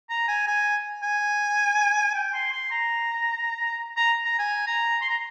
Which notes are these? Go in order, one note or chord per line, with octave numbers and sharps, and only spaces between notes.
A#5
G#5
G#5
G#5
G5
C6
C6
A#5
A#5
A#5
G#5
A#5
C6
A#5